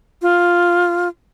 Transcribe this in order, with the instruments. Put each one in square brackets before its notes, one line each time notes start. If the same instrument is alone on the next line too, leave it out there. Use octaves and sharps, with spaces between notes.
[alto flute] F4